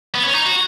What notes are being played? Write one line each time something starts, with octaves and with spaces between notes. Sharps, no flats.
B3
C#4
D#4
F#4